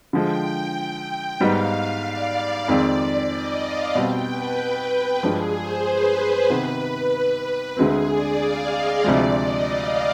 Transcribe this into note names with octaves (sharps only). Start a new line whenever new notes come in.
D3 F3 G#3 G5
G#2 G3 B3 D#4 F5
D5
F2 D#3 G#3 C4 D5
D#5
F5
B2 G3 C4 G5
B4
B4
G2 F3 G#3 D4 G#4
C5
B4
C3 D#3 B3
D2 D3 G#3 C4 G#4
D5
F5
D#5
D2 C3 F3 G#3 D5
D#5
F5